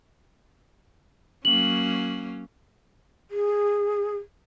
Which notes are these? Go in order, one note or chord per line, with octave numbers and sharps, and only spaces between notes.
F#3 A#3 C#4 F#7
G#4